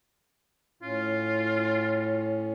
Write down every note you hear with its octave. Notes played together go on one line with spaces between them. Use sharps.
A2 C#4 F4